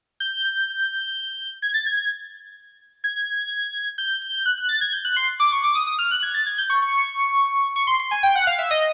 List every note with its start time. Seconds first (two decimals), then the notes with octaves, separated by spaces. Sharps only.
0.20 G6
1.62 G#6
1.74 A6
1.86 G#6
1.97 G#6
3.04 G#6
3.98 G6
4.22 G6
4.46 F#6
4.58 F#6
4.69 A6
4.81 G#6
4.92 G6
5.05 F#6
5.16 C6
5.40 D6
5.52 C#6
5.64 D6
5.75 D#6
5.87 D#6
5.99 F6
6.11 F#6
6.23 G#6
6.34 A6
6.46 G#6
6.58 G6
6.70 C#6
6.82 C#6
7.76 C#6
7.87 C6
8.00 C6
8.11 G#5
8.23 G5
8.35 F#5
8.47 F5
8.59 E5
8.71 D#5